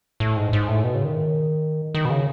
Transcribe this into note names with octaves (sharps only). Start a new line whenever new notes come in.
A2
G#2
G#2
A2
B2
C#3
D#3
D#3
B2
C#3